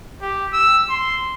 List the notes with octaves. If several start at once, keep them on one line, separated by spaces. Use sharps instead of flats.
G4
E6
C6